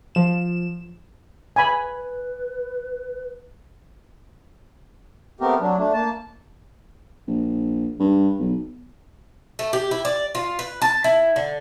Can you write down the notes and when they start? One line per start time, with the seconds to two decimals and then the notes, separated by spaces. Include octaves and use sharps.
0.15 F3 E7
1.56 B4 G#5 B5
5.40 A3 B3 C4 G4 A#4
5.60 F#3 D4
5.78 A3 D4
5.93 A#3 A5
7.27 A#1
7.99 G2
8.39 B1
9.59 A3
9.73 G4
9.91 E4
10.05 D5
10.35 F4
10.59 B4
10.82 A5
11.04 E4
11.36 D3